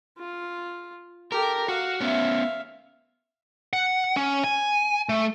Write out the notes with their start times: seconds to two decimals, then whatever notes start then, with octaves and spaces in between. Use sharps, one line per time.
0.19 F4
1.32 G4 A4 A#4
1.68 F#4 F5
2.00 B3 C#4 E5 F5
3.73 F#5
4.17 C#4
4.44 G#5
5.09 A3